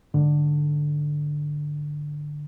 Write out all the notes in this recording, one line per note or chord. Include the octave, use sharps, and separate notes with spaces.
G#2 D3